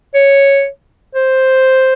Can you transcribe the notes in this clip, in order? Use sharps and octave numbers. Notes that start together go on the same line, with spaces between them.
C#5
C5